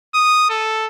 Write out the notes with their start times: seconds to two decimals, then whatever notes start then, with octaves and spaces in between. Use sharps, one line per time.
0.14 D#6
0.50 A4